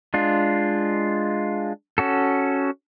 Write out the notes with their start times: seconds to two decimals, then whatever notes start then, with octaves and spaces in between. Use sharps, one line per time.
0.14 G#3 D4 F4
1.98 C#4 F#4 A4